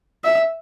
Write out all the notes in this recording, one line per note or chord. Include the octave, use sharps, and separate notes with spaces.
E5